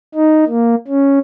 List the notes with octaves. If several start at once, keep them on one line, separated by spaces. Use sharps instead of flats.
D#4
A#3
C#4